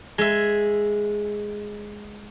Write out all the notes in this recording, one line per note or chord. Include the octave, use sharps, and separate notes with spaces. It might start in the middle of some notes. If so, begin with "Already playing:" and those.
G#3 E5